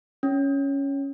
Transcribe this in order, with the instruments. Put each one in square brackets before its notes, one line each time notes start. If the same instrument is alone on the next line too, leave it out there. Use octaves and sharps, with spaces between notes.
[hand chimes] C#4